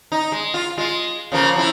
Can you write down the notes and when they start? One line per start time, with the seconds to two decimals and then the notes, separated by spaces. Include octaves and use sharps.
0.12 D#4
0.32 G#3
0.54 F4
0.77 G#3 F4
1.32 C#3 F3 A#3
1.56 F3 C#4 E4